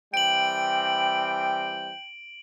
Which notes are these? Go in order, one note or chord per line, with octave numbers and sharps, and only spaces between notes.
E3 G3 C4 G5 D7 F#7